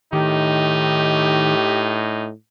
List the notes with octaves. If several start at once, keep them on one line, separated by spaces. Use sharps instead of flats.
A2 D#3 D#4 G4